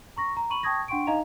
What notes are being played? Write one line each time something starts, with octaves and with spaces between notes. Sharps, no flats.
A#5 C#6 A#6
A#5
B5 C#6 D#7 F#7
G5 A5 C#6 D#6 G#6 A#6
D4 F#5 G5 C6 C#6 D7
D#4 D#5 F5 A#5 F7